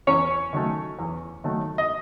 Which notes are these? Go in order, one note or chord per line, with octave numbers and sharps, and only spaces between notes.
E2 C#4 C#5
D#3 F#3 A3
E2
D#3 F#3 A3
D#5